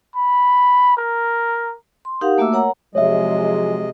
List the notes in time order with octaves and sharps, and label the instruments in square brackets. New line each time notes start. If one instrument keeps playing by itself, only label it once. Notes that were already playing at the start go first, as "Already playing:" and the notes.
[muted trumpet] B5
A#4
[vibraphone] C6
D#4 G4 A#4 F5 F#5
A3 A#3 F#4 E5 D6 E6
A#4 C#5 F#5 A#5
[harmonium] C3 D#5 [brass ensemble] F3 F#3 G#3 [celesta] C#5 E5